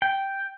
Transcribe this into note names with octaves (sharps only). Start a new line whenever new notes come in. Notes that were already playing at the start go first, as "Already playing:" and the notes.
G5